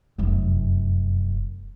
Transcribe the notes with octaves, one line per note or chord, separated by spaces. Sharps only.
F1 F#2